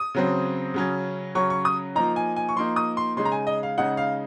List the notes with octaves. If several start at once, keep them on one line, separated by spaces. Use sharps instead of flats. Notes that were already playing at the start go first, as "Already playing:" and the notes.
Already playing: D#6
C#3 F#3 C4
C#3 F#3 C#4
C#3 F#3 C#4 C#6
C#6
D#6
F3 A#3 D#4 A#5
G#5
G#5
C#6
F3 A#3 D#4 C6
D#6
C6
C#3 G#3 D#4 C6
A#5
G#5
D#5
F5
C#3 G#3 D#4 F#5
F5